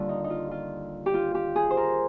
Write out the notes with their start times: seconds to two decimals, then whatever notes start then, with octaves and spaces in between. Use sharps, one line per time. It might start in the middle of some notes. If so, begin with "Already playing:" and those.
Already playing: D#2 D3 G3 F4
0.09 D#4
0.24 D#4
0.30 F4
0.51 F4
1.06 G4
1.14 F4
1.35 G4
1.56 G#4
1.70 C5
1.77 A#4